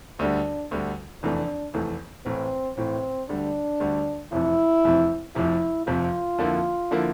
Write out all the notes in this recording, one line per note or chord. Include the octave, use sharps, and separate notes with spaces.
D2 D3 G3 D4
D2 D3 G3
F1 E2 E3 A3 D4
F1 E2 E3 A3
A1 A2 E3 C4
A1 A2 E3 C4
D2 D3 G3 D4
D2 D3 G3
F1 F2 C3 E3 E4
F1 F2 C3 E3
F1 F2 C3 F3 E4
F1 F2 C3 F3 F4
F2 D3 F3 A#3 E4
D3 F3 A#3 E4